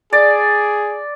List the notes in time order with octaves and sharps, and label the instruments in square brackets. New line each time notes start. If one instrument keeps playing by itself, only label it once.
[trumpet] G#4 [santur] D5